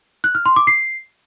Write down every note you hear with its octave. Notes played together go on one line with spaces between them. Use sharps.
F#6
F6
C6
D6
C7